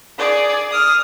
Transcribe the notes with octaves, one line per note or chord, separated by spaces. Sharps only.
G#4 D5
D#6 F6